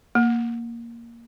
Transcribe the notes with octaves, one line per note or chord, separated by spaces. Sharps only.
A#3